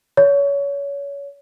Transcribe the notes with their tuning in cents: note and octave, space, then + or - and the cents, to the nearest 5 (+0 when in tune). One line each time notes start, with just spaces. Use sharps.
C#5 +25